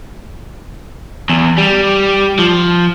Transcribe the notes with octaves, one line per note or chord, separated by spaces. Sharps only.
E2
G3
F3